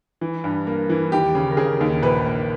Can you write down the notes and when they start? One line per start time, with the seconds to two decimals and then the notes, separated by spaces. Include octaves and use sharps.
0.21 E3
0.44 G2
0.67 A#3
0.89 E3
1.12 D#2 G4
1.35 C#3
1.51 A#4
1.57 C#3 G#4
1.81 D#2
2.03 A#1 B4
2.26 A#3